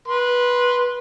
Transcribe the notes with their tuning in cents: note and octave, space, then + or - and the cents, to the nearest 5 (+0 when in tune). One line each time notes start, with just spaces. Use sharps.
B4 -15 C6 +0